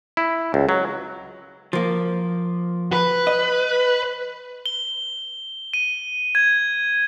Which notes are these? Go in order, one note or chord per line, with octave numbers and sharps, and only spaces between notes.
E4
C#2
F#3
F3 A#3
B4
D#5
G7
D#7
G#6